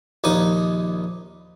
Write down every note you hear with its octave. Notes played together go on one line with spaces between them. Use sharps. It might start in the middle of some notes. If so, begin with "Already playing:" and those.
A#1 D#2 D#4 D#6